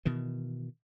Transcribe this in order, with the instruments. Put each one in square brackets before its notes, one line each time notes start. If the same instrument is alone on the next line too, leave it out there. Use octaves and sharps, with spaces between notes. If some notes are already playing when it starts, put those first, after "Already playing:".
[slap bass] B2 D#3 E3